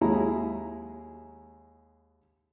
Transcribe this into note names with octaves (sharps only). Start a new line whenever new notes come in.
D#2 F#3 G#3 E4 A#5